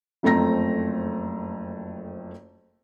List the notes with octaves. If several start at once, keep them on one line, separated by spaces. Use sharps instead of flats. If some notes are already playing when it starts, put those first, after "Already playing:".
F#1 F2 A3 C4 A#5 A#6